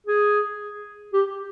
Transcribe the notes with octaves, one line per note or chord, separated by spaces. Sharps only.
G#4
G4